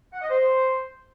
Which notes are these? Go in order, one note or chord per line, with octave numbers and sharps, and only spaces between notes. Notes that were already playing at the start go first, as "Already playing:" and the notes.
F#5
D#5
C5